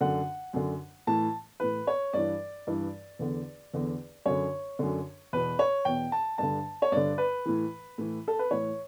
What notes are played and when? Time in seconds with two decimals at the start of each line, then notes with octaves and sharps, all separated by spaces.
0.01 F#2 D3 F#5
0.53 F#2 D3
1.07 A2 E3 A5
1.60 A2 E3 B4
1.87 C#5
2.13 G2 E3 D5
2.67 G2 E3
3.19 E2 D3
3.74 E2 D3
4.26 F#2 D3 C#5
4.79 F#2 D3
5.33 E2 B2 B4
5.59 C#5
5.85 E2 B2 G5
6.12 A5
6.38 G2 D3 A5
6.82 C#5
6.92 G2 D3 D5
7.18 B4
7.46 A2 E3
7.98 A2 E3
8.28 A4
8.39 B4
8.51 A2 E3 C#5